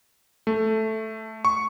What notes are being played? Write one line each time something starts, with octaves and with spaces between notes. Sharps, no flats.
A3
C#6